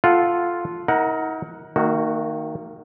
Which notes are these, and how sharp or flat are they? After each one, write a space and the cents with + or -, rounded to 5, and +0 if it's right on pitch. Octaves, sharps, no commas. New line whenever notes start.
F4 +0 A4 -10 F#5 +0
D#4 +40 A#4 +0 F#5 +0
D#3 +0 A#3 -40 F#4 +5